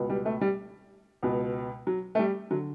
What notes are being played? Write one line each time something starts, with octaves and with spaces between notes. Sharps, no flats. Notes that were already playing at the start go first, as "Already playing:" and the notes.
Already playing: C#2 B2
G3
A3
G3
C#2 B2
F#3
A3
G3
D3 F#3